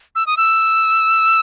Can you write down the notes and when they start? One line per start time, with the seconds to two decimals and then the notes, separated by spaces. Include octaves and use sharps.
0.15 E6
0.27 D#6
0.37 E6